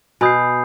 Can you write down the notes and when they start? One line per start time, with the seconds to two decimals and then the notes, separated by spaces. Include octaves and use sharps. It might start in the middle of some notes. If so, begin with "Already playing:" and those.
0.21 B2 G#5 B5 D#6 G6 C7